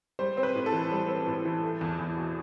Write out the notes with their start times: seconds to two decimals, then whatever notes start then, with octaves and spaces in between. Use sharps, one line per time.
0.19 G3 C5
0.37 C4
0.43 B4
0.55 A2
0.66 A4
0.72 E3
0.91 G3
1.08 C4
1.27 A2
1.45 E3
1.63 A3
1.81 E2
1.99 E2
2.17 B2